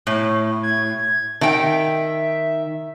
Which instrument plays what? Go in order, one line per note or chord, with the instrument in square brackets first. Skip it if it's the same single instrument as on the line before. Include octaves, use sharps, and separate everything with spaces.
[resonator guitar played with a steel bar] A2
[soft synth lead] G#6
[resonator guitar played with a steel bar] D#3 G5 [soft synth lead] E5